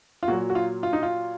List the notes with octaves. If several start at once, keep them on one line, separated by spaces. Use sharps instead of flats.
F4
A#2 F#3 F#4
F#4
F4
F4
D#4
F4